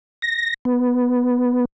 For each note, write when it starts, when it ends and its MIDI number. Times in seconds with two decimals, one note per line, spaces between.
0.22 0.54 94
0.65 1.65 59